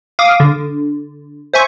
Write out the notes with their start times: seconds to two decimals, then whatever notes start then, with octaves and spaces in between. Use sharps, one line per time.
0.19 F5 D6 D#6
0.40 D3
1.54 C5 E5 G#5 C#6